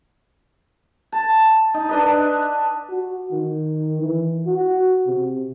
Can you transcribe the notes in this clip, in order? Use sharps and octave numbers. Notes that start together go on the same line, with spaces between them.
A5
D#4
D4 B4 D#5
F#4
D#3
E3
F#4
C3